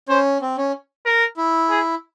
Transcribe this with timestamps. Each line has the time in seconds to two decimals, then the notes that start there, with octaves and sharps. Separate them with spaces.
0.09 C#4 C5
0.42 C4
0.58 C#4
1.05 A#4
1.37 E4
1.70 G#4